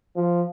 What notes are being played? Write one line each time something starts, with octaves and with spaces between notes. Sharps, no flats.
F3